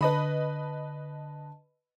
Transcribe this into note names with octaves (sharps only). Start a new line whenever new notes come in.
D3 B4 D#5 A5 B5